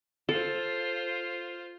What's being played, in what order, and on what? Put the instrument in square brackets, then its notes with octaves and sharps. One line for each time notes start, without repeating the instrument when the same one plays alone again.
[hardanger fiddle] F4 C5 [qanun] A4